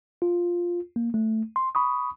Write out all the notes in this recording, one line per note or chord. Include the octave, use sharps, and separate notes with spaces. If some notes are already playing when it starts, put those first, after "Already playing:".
F4
A#3
A3
C6
B5 C#6 D#6